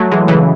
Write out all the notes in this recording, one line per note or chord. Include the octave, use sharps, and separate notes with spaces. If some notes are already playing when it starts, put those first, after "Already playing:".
Already playing: F#3 A3
E3 G#3
C#3 E3